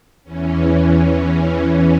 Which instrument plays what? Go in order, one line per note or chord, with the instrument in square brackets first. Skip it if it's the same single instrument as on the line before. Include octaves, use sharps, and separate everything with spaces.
[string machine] E2 E3 C#4
E2 E3 C#4